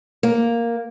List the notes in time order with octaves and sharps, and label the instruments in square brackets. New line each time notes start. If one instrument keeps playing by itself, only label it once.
[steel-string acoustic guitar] A#3